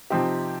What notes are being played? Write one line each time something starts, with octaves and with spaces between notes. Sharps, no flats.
C3 F3 C4 D#4 G4